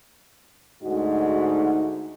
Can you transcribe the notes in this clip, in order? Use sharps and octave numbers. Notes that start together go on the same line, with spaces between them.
D2 G#2 D#4 F#4